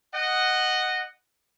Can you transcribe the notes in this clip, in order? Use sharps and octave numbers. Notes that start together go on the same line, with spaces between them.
D#5 F#5